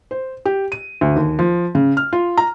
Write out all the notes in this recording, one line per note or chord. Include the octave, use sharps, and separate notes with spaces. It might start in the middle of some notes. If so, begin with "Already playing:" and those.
C5
G4
D#7
D2
D#2
F3
C#3
F6
F4
A#5